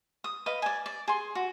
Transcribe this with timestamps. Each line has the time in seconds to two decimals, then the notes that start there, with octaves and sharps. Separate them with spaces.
0.24 D#6
0.46 B4 D#5 F5
0.62 D5 G#5
0.86 D5
1.08 G#4 C6
1.35 F#4